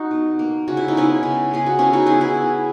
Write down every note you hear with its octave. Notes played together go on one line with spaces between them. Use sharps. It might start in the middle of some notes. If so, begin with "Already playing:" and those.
Already playing: D#4 F#4
B2
A#3
C#3 F#4
E4
D#4
G#3 B3 C#4 E4
C#3
G#3 B3 G#4
F#4
C#3 C#4 E4
D#4 F#4
E3 B3 E4 G#4
E4 G#4
C#3